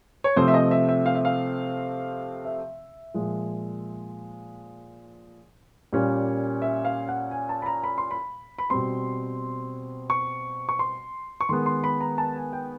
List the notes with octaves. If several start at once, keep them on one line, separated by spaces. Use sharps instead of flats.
C#5
C3 F3 A3 C4 C5
E5
D#5
E5
E5
F5
E5
F5
E5
A#2 F3 G#3
A#2 G3 A#3 C#4
E5
F5
F#5
G#5
A5
B5
A#5
B5
C6
B5
B5
B2 G3 C4 C6
C#6
C#6
C6
C#6
D#3 G#3 B3 C6
C6
B5
A#5
A5
G#5
G5